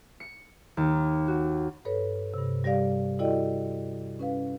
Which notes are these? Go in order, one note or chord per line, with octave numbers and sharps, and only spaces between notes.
C#7
D#2
F#4
G2 A4 B4 C#5
G2 C3
G3 G4 D5 F5
E4 F#4 A4 D5 D#5 G5
C#4 B4 F5